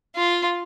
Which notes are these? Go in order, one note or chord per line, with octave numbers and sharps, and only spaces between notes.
F4